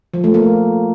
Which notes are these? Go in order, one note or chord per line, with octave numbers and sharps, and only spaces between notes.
F3
A3
A#3